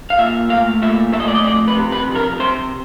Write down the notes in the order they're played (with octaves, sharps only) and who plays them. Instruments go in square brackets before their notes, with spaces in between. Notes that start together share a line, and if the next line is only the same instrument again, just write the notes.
[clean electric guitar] F5
A#2 E5
A3 F5
A#2 E5
A3 E5
D#5
D5
D#5
F2 D5
B4
C3
B4
F2
A#4
C3 C5